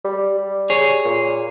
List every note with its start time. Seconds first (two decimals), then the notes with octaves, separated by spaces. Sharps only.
0.05 G3
0.37 G3
0.70 G#4 C#5
1.05 A#2